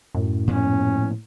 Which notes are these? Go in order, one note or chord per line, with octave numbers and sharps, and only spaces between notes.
F#2 A2
A#2 F3 B3 C#4